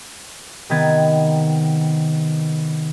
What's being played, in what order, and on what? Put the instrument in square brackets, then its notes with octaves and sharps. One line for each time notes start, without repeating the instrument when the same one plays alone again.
[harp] C3 D#3 B3 G#6 A6